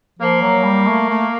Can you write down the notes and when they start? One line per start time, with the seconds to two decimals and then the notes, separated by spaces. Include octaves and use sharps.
0.19 F3 A#3
0.42 F#3
0.64 G3
0.87 A3
1.09 A3